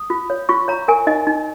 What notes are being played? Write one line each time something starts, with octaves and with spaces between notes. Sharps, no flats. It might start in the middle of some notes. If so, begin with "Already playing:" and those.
Already playing: D#6
F4
C#5
F4 C#6
C#5 A#5
A#4 G#5
D#4 D#5
D#4